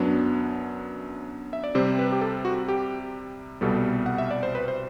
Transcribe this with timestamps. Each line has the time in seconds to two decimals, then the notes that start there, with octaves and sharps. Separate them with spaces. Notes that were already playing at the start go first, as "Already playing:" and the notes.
Already playing: F#2 F#3 B3 D4
1.53 E5
1.64 D5
1.75 C3 G3 C4 C5
1.99 B4
2.12 G4
2.21 A4
2.45 F#4
2.68 G4
3.61 C2 B2 G3 A4
4.06 F#5
4.18 E5
4.31 D5
4.43 C5
4.55 B4
4.68 C5